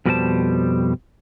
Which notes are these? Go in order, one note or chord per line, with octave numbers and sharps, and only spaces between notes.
F2 B2 G3 F#4 C5 A5